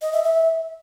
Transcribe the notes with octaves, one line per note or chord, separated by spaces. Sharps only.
D#5
E5
E5